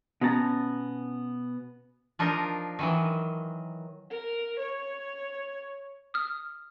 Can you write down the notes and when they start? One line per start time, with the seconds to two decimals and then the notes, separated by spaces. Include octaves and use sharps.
0.21 B2 B3 C#4 A5 A#5
2.19 F3 D4 D#4 F4 A#4
2.79 D#3 E3 F#3
4.10 A#4
4.59 C#5
6.14 D#6 F6